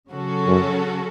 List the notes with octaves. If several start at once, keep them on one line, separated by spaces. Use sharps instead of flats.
C#3 F#3 C#4 F#4 A4
F#2